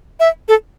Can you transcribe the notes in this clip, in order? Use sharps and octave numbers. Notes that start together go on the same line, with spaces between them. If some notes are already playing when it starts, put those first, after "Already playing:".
E5
A4